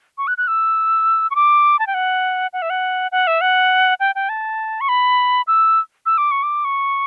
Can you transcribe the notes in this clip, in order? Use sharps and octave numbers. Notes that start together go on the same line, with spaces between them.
C#6
F#6
F#6
E6
C#6
D6
A5
G5
F#5
F#5
E5
F#5
F#5
E5
F#5
G5
G5
A5
C#6
B5
E6
E6
D6
C#6
D6
C#6